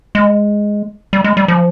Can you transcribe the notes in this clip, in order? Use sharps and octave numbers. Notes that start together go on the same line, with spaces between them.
G#3
G3
G#3
G3
F3